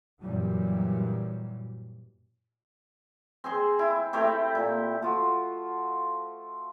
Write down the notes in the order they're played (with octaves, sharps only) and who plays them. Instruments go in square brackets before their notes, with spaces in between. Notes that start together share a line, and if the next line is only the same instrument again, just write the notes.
[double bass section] F#2 A#2 E3 F#3 G3
[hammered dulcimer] C4 G#4 C6
E4
A3 C4 E4 G4
A#2
[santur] F3 A3 F4 F#4